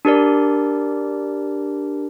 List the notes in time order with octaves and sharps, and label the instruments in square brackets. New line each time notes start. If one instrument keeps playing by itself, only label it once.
[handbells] D4 G4 A#4 D5